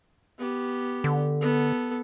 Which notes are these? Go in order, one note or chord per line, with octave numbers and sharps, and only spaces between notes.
B3 G4
D3
B3 A4